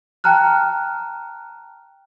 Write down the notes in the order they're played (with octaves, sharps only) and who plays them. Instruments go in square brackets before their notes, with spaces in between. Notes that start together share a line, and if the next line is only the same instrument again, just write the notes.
[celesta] G5 A5 A#5 F6 F#6